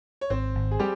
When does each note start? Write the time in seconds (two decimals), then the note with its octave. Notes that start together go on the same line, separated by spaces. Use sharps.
0.21 C#5
0.30 G#1 C4 C5
0.55 G#1
0.71 G#4
0.79 G3 G4